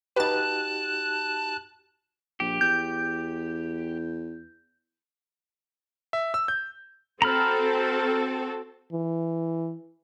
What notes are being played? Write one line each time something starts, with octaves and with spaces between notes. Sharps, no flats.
D#4 F#4 G4 B4 A5 F#6 A6
A#1 G4
E2 G6
E5
E6
G6
C4 F#4 A4 A#5 B5 F6
E3